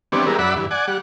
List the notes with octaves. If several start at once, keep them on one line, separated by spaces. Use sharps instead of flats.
E3 G3 B3 C4 D4 C#5
G3 G#3 B3 E4 A#4
F#2 D5 E5 F#5 B5
G2 E3
D5 F#5 G#5
G3 F#5